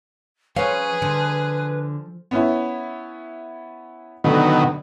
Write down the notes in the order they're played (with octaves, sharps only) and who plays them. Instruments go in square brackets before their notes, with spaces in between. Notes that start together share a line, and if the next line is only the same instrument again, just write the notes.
[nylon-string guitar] F3 F5 [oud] C#4 C5 [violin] G#4 [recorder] B4
[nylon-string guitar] D3 [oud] F3
[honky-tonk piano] B3 C#4 E4
[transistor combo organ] B2 D#3 F#3 [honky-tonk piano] D3